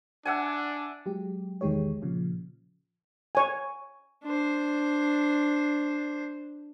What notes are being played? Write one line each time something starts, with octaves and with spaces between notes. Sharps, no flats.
D4 E5 F#5 G#5
F#3 G#3 G4
B1 E2 D#3 G#3 G4 C#5
A#2 C#3 F3
C#5 G#5
D4 C5